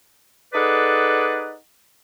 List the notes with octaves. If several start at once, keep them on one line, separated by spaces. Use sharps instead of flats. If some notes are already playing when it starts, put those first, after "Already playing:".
D#4 G#4 A4 B4 D5 F#5